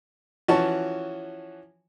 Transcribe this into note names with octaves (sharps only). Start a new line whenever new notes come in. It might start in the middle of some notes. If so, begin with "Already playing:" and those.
E3 F3 C#4 F#4 A5 C#6